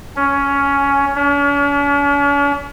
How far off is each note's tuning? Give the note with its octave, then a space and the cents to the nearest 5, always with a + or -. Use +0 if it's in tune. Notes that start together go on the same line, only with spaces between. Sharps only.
C#4 +10
C#4 +45